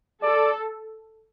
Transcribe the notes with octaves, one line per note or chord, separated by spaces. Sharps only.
A4 D5